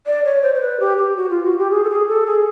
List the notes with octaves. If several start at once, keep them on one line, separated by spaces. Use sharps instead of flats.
D5
C#5
C5
C5
B4
G4
G4
F#4
F4
F#4
G4
G#4
A4
G#4
A4
G#4